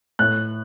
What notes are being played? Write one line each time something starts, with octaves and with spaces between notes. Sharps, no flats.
A2 F#6